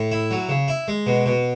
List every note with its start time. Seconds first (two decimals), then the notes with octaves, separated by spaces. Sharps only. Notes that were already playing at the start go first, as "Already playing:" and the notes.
Already playing: A2
0.12 E4
0.31 F#3
0.49 C#3
0.68 E4
0.88 G#3
1.07 B2
1.26 B2